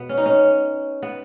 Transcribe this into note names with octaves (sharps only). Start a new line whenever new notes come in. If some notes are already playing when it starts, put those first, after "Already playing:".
Already playing: B2 B3
C#4
D#4
C#4
B3